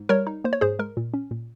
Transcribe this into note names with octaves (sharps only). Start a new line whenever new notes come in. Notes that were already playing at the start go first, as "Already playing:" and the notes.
Already playing: G#2
G3 A#4 C#5
D#4
A#3 C5
C#5
G#2 G#4 C5
G#3 A#4
A#2
C#4
A#2